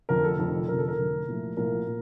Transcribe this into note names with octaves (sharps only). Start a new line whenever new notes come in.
F1 F2 D3 A#4
A4
F1 F2 D3 A4
F1 F2 D3 A#4
A4
A#4
F1 F2 D3
C2 A#2 F3 A3
C2 A#2 F3 A3 A#4
A#2